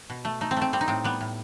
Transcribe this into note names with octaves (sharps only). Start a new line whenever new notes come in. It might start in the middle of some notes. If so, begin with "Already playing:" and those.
B2
A3
A3 D#4
C4
A3
C4
G3 C4
D#4
A2 C4
G3 B3
A2